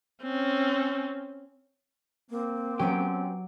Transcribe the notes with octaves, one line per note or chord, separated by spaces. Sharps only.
C4 C#4
A#3 C4
F#3 B3 C#4 G4 D6 D7